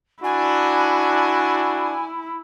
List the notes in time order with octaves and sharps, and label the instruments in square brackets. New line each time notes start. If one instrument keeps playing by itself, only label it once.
[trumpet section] D4 [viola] E4 [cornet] F#4 [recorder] G#5